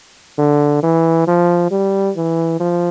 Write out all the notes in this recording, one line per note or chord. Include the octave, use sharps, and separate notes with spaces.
D3
E3
F3
G3
E3
F3